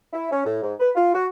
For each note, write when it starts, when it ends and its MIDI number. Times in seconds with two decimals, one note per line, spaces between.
0.13 0.30 64
0.32 0.43 61
0.45 0.61 45
0.63 0.73 44
0.80 0.90 71
0.95 1.10 65
1.14 1.26 66